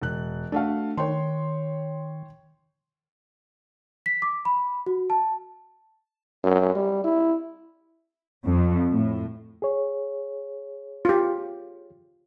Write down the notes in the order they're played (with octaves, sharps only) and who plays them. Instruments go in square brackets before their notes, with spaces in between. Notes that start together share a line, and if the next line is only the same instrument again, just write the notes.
[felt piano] E1 F#6
[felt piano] A3 F#4 F5 [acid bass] D4
[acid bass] D#3 [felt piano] C#5 G5 C6
[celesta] B6
D6
B5
F#4
A5
[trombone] F#2
G3
E4
[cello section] F2
A2
[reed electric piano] G#4 C#5
[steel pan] F4 G4